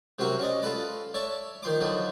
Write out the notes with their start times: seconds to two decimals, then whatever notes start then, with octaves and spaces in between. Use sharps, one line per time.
0.19 C3 F#3 C4 C#4 F#4 A#4
0.39 C#4 D5 D#5
0.62 F4 A4 B4 D5
1.14 C#5 D5 E5 A5
1.63 D#3 F3 C6 D6
1.80 D3 F3 F#3 D#4